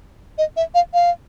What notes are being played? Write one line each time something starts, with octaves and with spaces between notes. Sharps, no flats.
D#5
E5
F5
F5